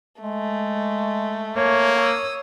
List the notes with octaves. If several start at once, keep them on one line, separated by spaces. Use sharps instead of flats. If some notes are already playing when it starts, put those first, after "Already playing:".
G#3 A3
A#3 C#5
D#6 E6